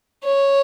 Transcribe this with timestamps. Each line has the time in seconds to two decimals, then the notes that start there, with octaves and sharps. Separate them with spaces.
0.23 C#5